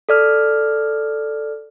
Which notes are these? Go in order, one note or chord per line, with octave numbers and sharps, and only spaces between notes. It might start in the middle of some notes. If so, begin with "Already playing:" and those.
A4 D5 F6